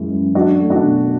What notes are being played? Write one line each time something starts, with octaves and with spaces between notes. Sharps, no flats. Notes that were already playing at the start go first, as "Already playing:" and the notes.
Already playing: F#2 E3 G#3
F#2
F#3 D4 F#4
A3
D4 F#4
B2